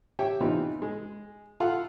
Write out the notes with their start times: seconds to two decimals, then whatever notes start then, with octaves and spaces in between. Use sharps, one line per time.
0.19 G4 C#5 E5 G5
0.41 C3 E3 B3 C4 D#4 F4
0.82 G#3
1.60 F4 A4 F5 F#5